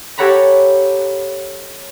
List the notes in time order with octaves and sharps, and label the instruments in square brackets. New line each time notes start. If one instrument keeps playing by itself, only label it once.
[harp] G4 A4 C#5 F#5 A#5 B5